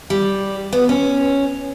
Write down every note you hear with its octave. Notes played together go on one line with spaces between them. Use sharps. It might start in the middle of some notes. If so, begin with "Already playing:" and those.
G3
B3
C#4